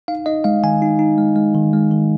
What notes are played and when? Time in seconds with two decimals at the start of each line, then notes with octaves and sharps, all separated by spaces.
0.08 D#4 F5
0.26 D#4 D#5
0.44 G#3 F5
0.63 D#3 G#5
0.82 D#4
0.99 D#4
1.18 G#3
1.36 G#3
1.55 D#3
1.73 G#3
1.91 D#3